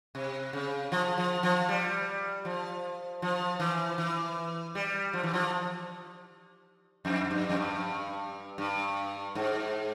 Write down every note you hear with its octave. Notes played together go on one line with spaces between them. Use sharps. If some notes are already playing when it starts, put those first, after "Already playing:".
C3
C#3
F3
F3
F3
G3
F3
F3
E3
E3
G3
F3
E3
F3
F2
G2
F2
G2
G2
G#2